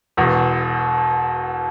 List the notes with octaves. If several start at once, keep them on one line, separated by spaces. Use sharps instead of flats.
E1 E2 B2